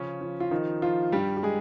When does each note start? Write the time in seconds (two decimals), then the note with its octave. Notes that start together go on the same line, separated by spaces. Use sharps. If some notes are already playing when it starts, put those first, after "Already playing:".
Already playing: C#3 F3 C#4
0.21 F3
0.40 F4
0.51 D#3 F3 D#4
0.82 F3 F4
1.12 G2 G3 G4
1.37 G4
1.43 G#3 G#4